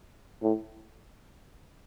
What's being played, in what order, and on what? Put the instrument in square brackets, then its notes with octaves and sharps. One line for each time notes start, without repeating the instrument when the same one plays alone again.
[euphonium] A2